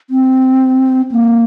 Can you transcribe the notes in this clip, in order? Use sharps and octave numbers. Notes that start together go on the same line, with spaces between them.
C4
A#3